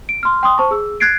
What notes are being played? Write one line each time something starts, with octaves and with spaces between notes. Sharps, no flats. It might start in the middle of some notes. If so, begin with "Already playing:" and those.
D7
C6 F6
G5 C6 D#6
C5 A5 C#6
G#4 E6
F#6 G#6 A6 C7 D7